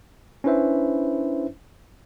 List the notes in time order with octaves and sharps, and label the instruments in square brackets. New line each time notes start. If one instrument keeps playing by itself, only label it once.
[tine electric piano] C#4 D4 E4 B4 C5 E5